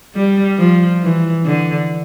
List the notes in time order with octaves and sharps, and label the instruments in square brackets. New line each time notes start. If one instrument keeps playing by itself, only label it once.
[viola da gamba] G3
F3
E3
D3